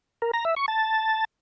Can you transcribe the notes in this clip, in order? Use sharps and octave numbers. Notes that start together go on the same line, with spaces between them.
A#4
A#5
E5
C#6
A5